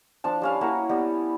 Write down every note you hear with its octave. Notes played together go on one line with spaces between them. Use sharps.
F3 D4 A5
G3 C#4 F5
A#3 E4 F#4 A#4
G3 B3